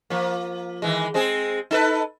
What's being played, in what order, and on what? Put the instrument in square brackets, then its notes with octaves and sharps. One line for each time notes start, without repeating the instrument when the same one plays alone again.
[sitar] F3 A#3
D#3 E3 G#3
G#3 C4 G#4
D#4 A4 B4